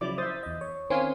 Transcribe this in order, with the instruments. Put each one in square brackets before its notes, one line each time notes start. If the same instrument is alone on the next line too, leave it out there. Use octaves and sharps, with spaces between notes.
[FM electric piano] C#3 F3 F#3 [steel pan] E4 D5 D6
[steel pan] C5 E5 [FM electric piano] D#6 A6
[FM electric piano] E2 D#5
C#5
[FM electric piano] D#3 C4 C#4 [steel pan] F5 G#5 C6